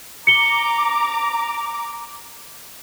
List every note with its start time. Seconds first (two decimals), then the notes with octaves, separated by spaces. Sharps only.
0.27 A#5 D6 C#7 G7